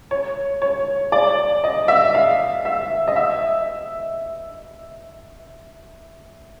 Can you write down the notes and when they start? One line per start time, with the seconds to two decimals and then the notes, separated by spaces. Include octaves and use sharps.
0.11 C#5
0.62 C#5
1.12 D5
1.64 D#5
1.88 E5
2.15 F5
2.65 E5
3.08 D#5
3.16 E5